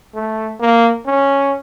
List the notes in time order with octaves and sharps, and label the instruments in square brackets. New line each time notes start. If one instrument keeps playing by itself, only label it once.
[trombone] A3
A#3
C#4